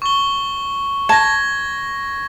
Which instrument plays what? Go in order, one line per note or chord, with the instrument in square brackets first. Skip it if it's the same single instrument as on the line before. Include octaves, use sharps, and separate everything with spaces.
[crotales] C#6 G7
[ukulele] A5 [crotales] G#6 A#6